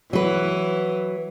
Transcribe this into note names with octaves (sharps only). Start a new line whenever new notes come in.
E3 F#3 B4